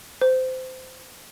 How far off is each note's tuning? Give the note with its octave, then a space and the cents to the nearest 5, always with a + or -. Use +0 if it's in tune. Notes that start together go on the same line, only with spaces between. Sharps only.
C5 -20